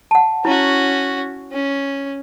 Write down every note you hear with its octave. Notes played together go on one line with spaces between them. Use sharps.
F#5 A5
C#4 E4 F#4
C#4